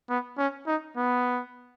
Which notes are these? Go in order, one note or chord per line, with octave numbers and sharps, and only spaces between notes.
B3
C#4
D#4
B3